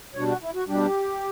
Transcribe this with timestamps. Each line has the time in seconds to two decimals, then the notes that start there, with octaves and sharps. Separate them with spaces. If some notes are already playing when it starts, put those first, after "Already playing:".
0.14 B2 G3 D4 C#5
0.28 F#4
0.41 E4
0.55 F#4
0.68 B2 G3 D4 G4